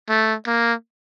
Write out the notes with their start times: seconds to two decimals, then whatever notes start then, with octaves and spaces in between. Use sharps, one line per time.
0.09 A3
0.47 A#3